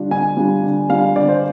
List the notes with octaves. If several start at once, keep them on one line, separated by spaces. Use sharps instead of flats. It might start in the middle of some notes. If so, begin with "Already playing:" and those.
Already playing: D3 G3 D4 F4
D3 G#5
G3 D4 F4
D3
G3 D4 F4 F5
D3 D5
C5